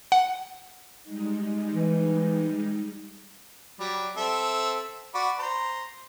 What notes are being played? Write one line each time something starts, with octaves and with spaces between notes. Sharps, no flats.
F#5
G3 G#3 D#4
E3
F#3 G3
C4 A4 E5
F#4 D5 B5
C5 A#5